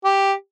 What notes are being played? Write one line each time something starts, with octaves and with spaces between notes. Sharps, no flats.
G4